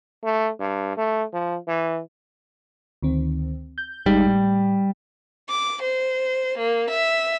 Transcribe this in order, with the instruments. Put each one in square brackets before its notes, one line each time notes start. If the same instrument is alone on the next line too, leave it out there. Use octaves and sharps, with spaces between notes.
[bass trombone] A3
G2
A3
F3
E3
[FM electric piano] D2 D#3 C4
G6
[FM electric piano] G#1 G#3 D#4 [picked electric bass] G3
[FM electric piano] A2
[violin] D6
C5
A#3
E5